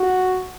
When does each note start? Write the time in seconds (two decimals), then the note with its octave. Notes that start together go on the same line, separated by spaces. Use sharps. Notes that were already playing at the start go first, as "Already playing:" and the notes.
Already playing: F#4